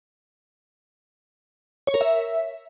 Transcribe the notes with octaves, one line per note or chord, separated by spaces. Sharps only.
C#5
A#4
E5